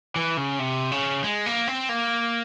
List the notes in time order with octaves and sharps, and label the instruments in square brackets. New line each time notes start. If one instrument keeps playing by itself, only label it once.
[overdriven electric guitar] E3
C#3
C3
C#3
G#3
A#3
C4
A#3